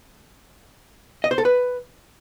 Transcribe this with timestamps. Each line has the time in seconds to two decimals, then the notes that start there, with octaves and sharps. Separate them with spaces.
1.24 D#5
1.31 C5
1.38 A4
1.45 B4